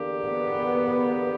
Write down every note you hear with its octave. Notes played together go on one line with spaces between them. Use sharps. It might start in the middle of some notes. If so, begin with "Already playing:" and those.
Already playing: E2 D3 A#3 D4 G4
B3